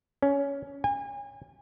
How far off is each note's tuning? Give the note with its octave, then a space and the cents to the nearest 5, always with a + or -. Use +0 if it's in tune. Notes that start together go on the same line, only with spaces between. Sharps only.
C#4 +15
G#5 -35